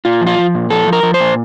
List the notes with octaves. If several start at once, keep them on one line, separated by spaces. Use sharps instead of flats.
A#2 F4
F3
F4
F3
A#2
F3 A4
F3
A#4
F3
C5
A#2